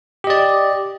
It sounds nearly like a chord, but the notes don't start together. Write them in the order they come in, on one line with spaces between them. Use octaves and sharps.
G4 D#5 D5